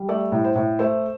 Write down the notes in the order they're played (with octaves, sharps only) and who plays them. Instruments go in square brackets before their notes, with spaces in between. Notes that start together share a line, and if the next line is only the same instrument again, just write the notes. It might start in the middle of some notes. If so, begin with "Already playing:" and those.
Already playing: [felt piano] G3
A3 D5
A2
C5
A2
A3 C5